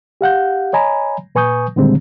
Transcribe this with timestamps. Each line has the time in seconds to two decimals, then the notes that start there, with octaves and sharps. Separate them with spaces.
0.21 G4 F5 F#5 G6
0.73 C#5 D#5 G#5 A#5 B5
1.35 A#2 B4 G#5 C#6 D#6 G6
1.76 A#2 D3 D#3 G3 G#3 C4